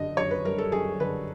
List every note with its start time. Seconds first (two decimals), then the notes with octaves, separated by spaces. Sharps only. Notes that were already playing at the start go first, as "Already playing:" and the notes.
Already playing: F#2 D3 D#5
0.17 F#2 C#5
0.31 B4
0.45 G3 A#4
0.58 A4
0.72 F#2 G#4
1.00 D3 B4